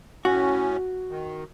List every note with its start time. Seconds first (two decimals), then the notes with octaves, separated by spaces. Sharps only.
0.25 A2 C#4 F#4
1.10 D#3